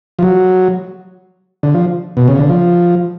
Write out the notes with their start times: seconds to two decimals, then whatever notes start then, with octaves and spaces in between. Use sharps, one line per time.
0.19 F3
0.23 F#3
1.63 D3
1.74 F3
2.17 B2
2.28 C#3
2.39 D3
2.50 F3